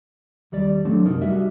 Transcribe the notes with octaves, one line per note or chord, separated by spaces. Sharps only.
D#2 G3 D5
F#3 A3 C4 D4
C2 F#2 D#4 A#4
G3 F#4 E5